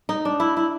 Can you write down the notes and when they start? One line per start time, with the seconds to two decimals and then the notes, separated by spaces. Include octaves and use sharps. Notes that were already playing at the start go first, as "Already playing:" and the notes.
0.09 D#4
0.25 D4
0.40 E4
0.57 E4